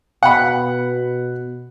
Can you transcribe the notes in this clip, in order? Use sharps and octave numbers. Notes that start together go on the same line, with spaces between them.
B2 F#5 B5